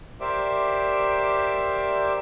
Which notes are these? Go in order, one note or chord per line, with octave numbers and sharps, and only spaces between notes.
G4 A#4 C5 D5 E5 D6